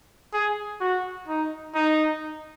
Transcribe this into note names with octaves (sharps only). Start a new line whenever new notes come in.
G#4
F#4
D#4
D#4